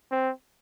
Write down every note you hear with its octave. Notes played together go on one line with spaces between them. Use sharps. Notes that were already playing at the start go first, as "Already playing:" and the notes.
C4